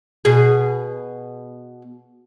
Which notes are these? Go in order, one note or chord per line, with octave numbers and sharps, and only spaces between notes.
B2 G#4